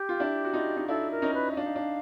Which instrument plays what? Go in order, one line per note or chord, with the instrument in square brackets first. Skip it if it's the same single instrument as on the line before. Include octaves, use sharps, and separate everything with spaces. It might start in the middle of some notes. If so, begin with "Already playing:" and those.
Already playing: [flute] G4
[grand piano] F4
D4 E4
F#4
D#4 F4
D#4
[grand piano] D4 E4 [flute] A4
[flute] A#4
[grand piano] C#4 D#4
[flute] B4
E5
[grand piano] D4 [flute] F5
[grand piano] D#4
D4